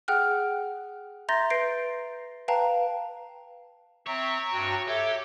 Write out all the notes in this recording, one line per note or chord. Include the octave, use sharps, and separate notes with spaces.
G#4 F#5 G5 F6 F#6
E5 A#5 C6 G6 A6 A#6
B4 G6 A#6 C7 D7
B4 F5 G5 A5 A#5
C4 C#5 E5 A#5
G2 F#4 G5
G4 A4 C#5 E5